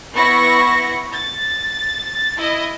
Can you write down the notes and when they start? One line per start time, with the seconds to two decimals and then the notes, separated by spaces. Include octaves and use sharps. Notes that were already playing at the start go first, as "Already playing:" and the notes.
0.14 B3 E4 C#6 A#6
1.11 A6
2.37 E4 D#5